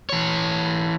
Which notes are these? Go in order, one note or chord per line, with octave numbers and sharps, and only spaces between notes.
E3 C#5